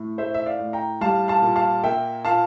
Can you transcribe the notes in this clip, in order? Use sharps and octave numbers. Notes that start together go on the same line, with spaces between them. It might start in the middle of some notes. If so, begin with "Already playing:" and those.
Already playing: A2
A3 C5 E5
E5
D5 F5
A2
G5 A#5
G3 F5 A5
F5 A5
A#2
F5 A5
A#3 E5 G5
A#2 F5 A5